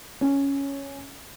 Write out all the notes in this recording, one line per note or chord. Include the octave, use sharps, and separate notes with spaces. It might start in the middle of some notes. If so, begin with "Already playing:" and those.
C#4